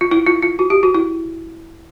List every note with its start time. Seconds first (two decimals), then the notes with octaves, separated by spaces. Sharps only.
0.01 F4
0.11 E4
0.26 F4
0.42 F4
0.59 F#4
0.70 G4
0.83 F#4
0.94 E4